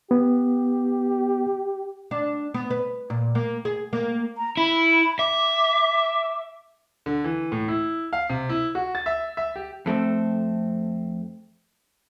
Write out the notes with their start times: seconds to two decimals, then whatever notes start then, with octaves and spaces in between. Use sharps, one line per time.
0.11 B3 G4
2.11 D4
2.54 B3
2.71 B4
3.10 A#2
3.35 A#3
3.65 G#4
3.93 A#3
4.36 A#5
4.57 E4 B5
5.19 E5 D6
7.06 D3
7.24 E3
7.52 A2
7.68 E4
8.13 F5
8.30 C3
8.49 E4
8.75 F#4
8.95 A6
9.06 E5
9.37 E5
9.56 G4
9.86 F2 A3 C4